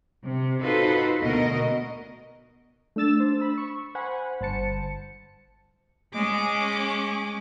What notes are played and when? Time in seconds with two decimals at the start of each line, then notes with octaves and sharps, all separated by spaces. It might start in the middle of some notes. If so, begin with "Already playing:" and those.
0.23 C3
0.61 D#4 F4 F#4 A4 B4 C5
1.22 D2 B2 F#4 A#4 D#5
2.96 A3 D4 E6 A6 E7
3.16 D4 C5
3.40 B5 E6
3.58 C#6
3.95 C5 F#5 G#5 B5
4.41 G1 C5 A5 C#7
6.13 G#3 C#4 D6